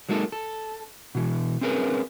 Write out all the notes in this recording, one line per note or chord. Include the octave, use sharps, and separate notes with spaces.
F#3 G#3 A#3 D#4 A4
A4
B2 E3
C4 C#4 G#4 A#4 B4